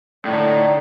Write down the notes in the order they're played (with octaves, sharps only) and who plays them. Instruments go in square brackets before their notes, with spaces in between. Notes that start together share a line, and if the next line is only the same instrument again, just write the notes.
[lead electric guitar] A2 [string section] D3 D#4 [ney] D5